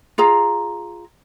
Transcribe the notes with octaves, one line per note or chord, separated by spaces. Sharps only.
F4 G#4 A#5